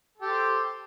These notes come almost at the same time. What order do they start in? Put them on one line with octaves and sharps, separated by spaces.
A4 G4 C5